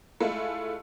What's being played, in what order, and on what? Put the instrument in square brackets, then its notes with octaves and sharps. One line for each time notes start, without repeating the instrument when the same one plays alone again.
[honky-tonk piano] G#3 A3 E4 F4